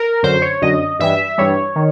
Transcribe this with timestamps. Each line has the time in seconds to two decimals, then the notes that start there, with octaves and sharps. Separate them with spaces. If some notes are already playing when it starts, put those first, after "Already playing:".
Already playing: A#4
0.23 F#2 D3 F#3 C5
0.42 C#5
0.62 F#2 D3 F#3 D#5
0.99 G2 E3 G3 E5
1.38 G2 E3 G3 C#5
1.76 D#3